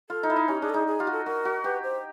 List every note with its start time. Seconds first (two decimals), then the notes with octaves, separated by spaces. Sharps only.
0.10 F4 A4
0.23 D#4
0.30 E4
0.36 D#4
0.48 C#4 G4
0.62 D4 G#4
0.69 A4
0.74 D#4 G#4
0.87 G#4
1.00 F4 G4
1.07 F#4
1.12 A4
1.26 F#4 A#4
1.45 F#4
1.64 G4 B4
1.83 C5